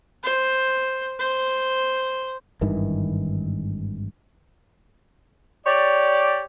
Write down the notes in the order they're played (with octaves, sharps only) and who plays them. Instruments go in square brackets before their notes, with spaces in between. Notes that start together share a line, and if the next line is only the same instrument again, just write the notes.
[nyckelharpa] C5
C5
[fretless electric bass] G#1 G2 D#3 E3
[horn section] G4 C#5 D5